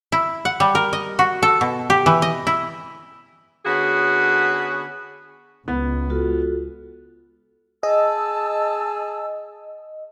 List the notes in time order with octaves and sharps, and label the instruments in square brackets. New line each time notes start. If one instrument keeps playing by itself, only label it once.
[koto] E4
F#5
G3
A#4
D#5
F#4
A4
B2
G4
E3
D#5
E4
[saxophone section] D3 B3 C#4 F#4 G#4
[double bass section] C#2 [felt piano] B3
[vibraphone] F4 F#4 A4
[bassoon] G#4 [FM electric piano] D#5 [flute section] A5 E6